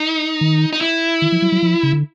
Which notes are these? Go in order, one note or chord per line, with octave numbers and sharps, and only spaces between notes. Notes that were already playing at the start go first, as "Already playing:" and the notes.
Already playing: D#4
D#3
D#4
E4
D#3
F3
F#3
F#3
F3
C#3
D3